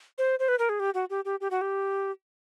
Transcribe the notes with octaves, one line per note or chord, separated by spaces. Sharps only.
C5
C5
B4
A#4
G#4
G4
F#4
G4
G4
G4
F#4
G4